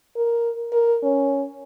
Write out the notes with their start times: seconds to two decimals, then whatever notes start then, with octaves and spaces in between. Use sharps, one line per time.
0.17 A#4
0.73 A#4
1.03 C#4